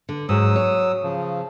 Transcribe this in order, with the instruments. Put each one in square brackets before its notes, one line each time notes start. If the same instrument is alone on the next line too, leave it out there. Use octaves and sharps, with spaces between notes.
[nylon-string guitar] D3
[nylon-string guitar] G#2 [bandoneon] F#3 D#6 E6
[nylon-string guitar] C#5
[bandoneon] C#3 F3